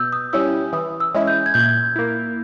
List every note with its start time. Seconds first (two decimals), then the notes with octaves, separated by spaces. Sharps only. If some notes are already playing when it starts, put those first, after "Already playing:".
Already playing: B2 E6 G6
0.13 D#6
0.33 G3 C#4 E4 E6
0.73 E3 D#6
1.00 E6
1.15 G#3 C#4 E4
1.27 G6
1.46 G#6
1.54 A#2 G6
1.96 A#3 E4